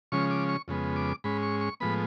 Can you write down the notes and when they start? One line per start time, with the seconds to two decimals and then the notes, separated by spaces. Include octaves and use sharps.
0.12 C#3 F3 G#3 C#4 C#6
0.31 D6
0.49 C#6
0.68 F2 C#3 G#3 B3
0.96 D6
1.24 G#2 G#3 C#4 B5
1.43 C#6
1.61 C#6
1.80 A2 F3 G#3 B3 B5